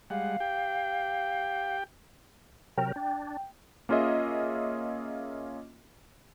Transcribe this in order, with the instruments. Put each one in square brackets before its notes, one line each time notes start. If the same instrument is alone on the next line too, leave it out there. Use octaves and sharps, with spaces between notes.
[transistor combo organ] G3 G#3 F#5 [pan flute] F5
[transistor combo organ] G4 G5
[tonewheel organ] C3 F#3 A#4 [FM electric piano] G5
[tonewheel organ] D4
[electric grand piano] A#3 C#4 F4 G#4 D#5 E5